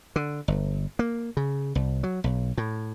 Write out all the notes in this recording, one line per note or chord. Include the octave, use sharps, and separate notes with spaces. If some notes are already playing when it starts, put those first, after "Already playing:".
D3
G1
A#3
C#3
C2
F#3
B1
A2